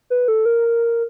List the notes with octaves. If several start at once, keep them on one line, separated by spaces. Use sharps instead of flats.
B4
A4
A#4